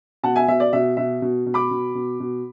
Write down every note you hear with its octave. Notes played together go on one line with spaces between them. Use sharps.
B2 F#5 A5
E5 G#5
B2 E5
D5
B2 E5
B2 E5
B2
B2
B5 D6
B2
B2
B2